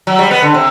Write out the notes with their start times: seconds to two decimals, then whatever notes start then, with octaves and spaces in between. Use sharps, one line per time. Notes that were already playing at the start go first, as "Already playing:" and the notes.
0.07 F#3
0.19 G3
0.31 B3
0.42 D3
0.54 C3